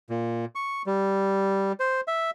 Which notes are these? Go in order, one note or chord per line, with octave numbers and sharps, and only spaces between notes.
A#2
C#6
G3
C5
E5